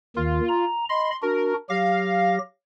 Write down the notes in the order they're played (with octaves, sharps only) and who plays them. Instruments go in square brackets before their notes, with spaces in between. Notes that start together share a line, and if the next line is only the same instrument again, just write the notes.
[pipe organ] D#2 D#3 [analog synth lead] F4
[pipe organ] A#5
[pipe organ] D#5 B5 [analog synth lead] C6
[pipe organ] D4 F#4 [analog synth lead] A#4
[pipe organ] F#3 G4 A#6 [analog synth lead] F5